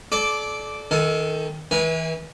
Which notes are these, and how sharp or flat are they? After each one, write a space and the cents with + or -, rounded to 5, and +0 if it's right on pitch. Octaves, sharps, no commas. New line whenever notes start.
A4 -35 D5 +0 D6 -5
D#3 +20 A4 +0 G#5 +35
E3 -30 B4 -35 G#5 -10